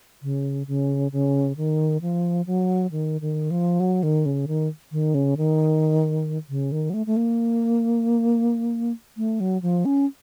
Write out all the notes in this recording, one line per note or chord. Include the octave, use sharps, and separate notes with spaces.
C#3
C#3
C#3
D#3
F3
F#3
D#3
D#3
F3
F#3
D#3
C#3
D#3
D#3
C#3
D#3
C#3
D#3
F#3
A3
A3
A#3
A3
F#3
F3
C#4